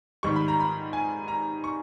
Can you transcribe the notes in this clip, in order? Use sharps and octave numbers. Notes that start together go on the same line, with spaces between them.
G#2 D#3 G3 C#6
B5
A#5
B5
G#5
A#5
C#6